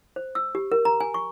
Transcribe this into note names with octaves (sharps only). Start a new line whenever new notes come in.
C5
E6
G4
A#4
A#5
G#5
C#6